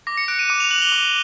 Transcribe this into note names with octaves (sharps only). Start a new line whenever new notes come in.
D6 A#6
C#7
F#6 D7
D#7
D6
F7
F#6 F#7
G7
D6